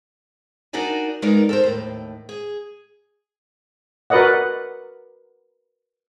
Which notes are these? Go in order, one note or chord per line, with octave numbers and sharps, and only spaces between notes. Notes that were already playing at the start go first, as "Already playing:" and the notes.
D4 D#4 F#4 A#4 D5 G#5
G#3 B3 D#4 A#4 D5
A4 A#4 C5
D#2 A2
G#4
F#4 A#4 B4 D5 D#5 F#5